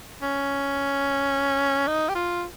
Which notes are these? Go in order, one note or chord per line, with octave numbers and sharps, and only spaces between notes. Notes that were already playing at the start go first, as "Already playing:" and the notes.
C#4
D#4
G4
F4